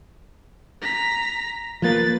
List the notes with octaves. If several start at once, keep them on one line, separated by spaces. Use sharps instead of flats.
A#5 B6
F3 A#3 B4 A6